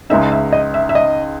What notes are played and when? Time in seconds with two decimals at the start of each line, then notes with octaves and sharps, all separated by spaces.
0.10 C#2 C#3 G#3 D#4 E5
0.32 E5
0.53 D#5
0.74 E5
0.89 E5
0.95 D#5